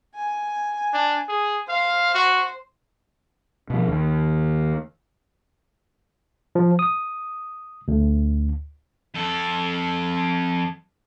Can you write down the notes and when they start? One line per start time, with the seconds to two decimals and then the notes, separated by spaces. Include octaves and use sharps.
0.16 G#5
0.93 D4
1.28 G#4
1.69 C5 F5
2.15 F#4
3.70 B2 F3
3.88 D#2
6.55 F3
6.79 D#6
7.88 D2
9.15 F2 A4